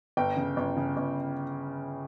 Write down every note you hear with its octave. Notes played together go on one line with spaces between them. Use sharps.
G1 G5
C#3
G1
C#3
G1